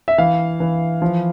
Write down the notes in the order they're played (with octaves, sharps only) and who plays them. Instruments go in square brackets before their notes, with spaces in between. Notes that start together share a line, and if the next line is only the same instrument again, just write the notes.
[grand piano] E5
E3 F5
E3
F3